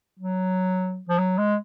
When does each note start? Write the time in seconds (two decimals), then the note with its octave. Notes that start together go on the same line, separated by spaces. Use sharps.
0.19 F#3
1.09 F3
1.18 F#3
1.38 G#3